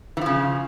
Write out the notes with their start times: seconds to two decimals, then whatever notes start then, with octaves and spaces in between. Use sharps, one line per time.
0.17 E3
0.21 F3
0.26 C#3